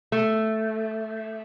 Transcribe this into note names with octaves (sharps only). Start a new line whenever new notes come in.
A3